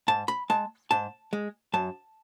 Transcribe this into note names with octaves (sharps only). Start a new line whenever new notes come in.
G#2 A5
B5
G#3 A5
G#2 A5
G#3
F#2 A5